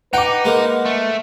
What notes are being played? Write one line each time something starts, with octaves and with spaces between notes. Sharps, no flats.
D#4 B4 F#5 G5 D6
G#3 A#3
A3